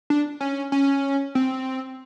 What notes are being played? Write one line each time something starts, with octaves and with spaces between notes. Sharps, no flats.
D4
C#4
C#4
C4